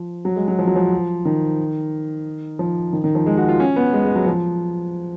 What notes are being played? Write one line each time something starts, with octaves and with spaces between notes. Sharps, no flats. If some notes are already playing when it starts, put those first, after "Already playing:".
Already playing: F3
F#3
G#3
F#3
F3
F#3
F3
D#3
F3
D#3
D#3
F3
G#3
F#4
F4
C#4
B3
G#3
G#3
F#3
F3